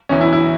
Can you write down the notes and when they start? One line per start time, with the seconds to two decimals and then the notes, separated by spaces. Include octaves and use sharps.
0.09 E1 E2 E3 C#4
0.21 E4
0.33 E4